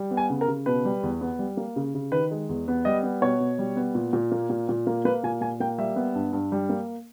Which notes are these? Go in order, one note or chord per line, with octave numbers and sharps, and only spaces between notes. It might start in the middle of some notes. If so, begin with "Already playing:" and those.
Already playing: G3
B3
G#5
C#3
A#4
C#3
B2 B4
G3
E2
B3
G3
A#3
C#3
C#3
D#3 B4
G#3
E2
B3
G3 D#5
B3
B2 C#5
B2
G3
B3
A#2
A#2
A#3
A#2
A#2
A#3
A#3 B4
A#2 G#5
A#2 G#5
A#3 G5
G3 E5
B3
G2
G2
G3
A#3